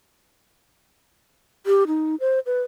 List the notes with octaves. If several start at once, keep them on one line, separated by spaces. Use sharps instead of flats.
G4
D#4
C5
B4